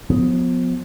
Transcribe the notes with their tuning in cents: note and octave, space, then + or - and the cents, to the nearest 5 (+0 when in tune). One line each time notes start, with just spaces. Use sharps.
F3 +35 B3 +15